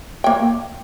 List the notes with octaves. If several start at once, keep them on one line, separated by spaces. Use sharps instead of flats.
A#3 G5